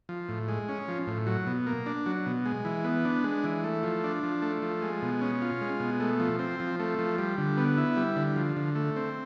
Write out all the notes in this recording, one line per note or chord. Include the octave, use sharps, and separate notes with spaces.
F3
A2
G#3
C#4
F3
A2
F#3
B2
A#3
D4
F#3
B2
G#3
E3
B3
D4
G#3
E3
A3
F3
D4
F3
A3
F3
G#3
B2
C#4
F4
G#3
B2
A3
F3
C4
F3
A3
F3
G3
D3
B3
E4
G3
D3
F3
D3
A3
C4